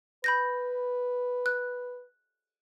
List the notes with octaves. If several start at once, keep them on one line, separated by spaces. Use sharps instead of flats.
B4 B5 G6 A#6
F#6